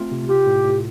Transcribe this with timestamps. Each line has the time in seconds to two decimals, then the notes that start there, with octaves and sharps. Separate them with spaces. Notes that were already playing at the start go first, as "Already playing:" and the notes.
Already playing: A3 C4 F4
0.12 C3
0.29 F4 G4
0.47 A2
0.64 A2